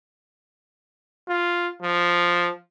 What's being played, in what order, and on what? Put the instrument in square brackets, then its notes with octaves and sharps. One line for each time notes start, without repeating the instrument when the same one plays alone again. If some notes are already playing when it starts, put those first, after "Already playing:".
[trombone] F4
F3